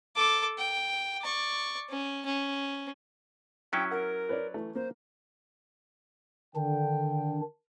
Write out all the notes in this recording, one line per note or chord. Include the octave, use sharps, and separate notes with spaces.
A4 D6
G5
D5 C#6
C#4
C#4
F#3 C#4 E4 G5 C#6 D#6 F#6
A#4 F#5
B4 C#5 D5
E3 A3
A#3 C5
D3 D#3 D4 G5